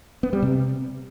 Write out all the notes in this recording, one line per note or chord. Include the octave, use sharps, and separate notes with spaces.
B3
G3
C3